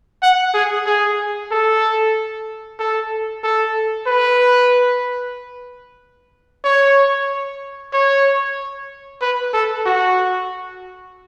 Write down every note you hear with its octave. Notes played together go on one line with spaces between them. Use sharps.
F#5
G#4
G#4
A4
A4
A4
B4
C#5
C#5
B4
A4
F#4